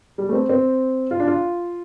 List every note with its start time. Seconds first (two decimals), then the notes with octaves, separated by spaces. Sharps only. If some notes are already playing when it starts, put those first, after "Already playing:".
0.18 G3
0.29 A3
0.33 C4
0.49 C4
1.11 F4
1.20 D4
1.28 F4